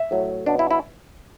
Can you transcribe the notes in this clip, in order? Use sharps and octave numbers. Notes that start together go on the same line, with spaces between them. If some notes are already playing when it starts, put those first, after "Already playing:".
Already playing: E5
A2 F#3 A3
B2 F#3 B3 D4
E4
E4